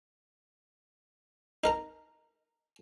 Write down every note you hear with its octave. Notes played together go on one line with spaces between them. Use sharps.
D#4 A#4 A#5